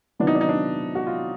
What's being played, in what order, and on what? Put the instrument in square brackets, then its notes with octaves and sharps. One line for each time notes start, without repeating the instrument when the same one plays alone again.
[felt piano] C3 D#3 F#3 B3 E4 [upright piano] D4
[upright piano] D#4
D4
D#4
D4
F#4
F4